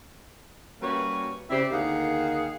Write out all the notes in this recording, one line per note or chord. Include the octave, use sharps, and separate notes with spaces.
G3 A#3 C#4 F#4 B4 C#5
C#3 C4 E4 G4 C5 D5
D2 D#3 A#3 G#4 F5 F#5